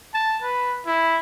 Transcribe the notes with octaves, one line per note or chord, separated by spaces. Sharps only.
A5
B4
E4